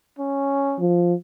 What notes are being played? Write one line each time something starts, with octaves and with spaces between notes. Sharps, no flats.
C#4
F3